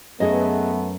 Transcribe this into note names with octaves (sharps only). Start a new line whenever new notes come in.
F#2 F#3 A3 B3 G#4 D#5